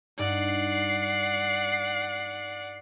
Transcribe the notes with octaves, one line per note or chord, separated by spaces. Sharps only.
G2 D#4 D5 F#5 C7